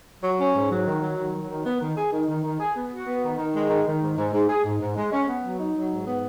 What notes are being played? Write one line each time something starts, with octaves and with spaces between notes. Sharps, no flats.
F#3
C#4
G#2
F#3
D#3
F#3
D#3
F#3
D#3
B3
D#3
G#4
D#3
D#3
D#3
G#4
B3
F#4
B3
D#3
D#3
G#3
D#3
D#3
G#2
G#2
G#2
G#4
G#2
G#2
G#3
C#4
B3
F#3
D#4
F#3
G#2
B3